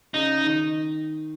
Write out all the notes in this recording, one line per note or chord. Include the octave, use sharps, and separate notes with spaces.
C#3 D#4
D#3